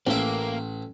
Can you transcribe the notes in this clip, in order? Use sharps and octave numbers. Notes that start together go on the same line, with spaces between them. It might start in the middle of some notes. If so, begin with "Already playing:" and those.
A1 A#3 C#4 E5